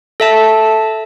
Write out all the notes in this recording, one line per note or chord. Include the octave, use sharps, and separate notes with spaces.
A4 E5 A5